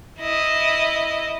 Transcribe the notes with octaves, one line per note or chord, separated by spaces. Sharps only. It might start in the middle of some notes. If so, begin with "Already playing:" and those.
E4 D#5